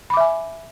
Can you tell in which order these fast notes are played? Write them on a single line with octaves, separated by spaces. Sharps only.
B5 D6 E5 G#5